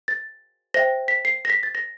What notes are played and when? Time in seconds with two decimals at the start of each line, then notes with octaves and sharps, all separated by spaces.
0.08 A6
0.74 C5 E5 G5 A#6
1.08 B6
1.25 C7
1.45 A#6
1.50 B6
1.63 A6
1.75 A#6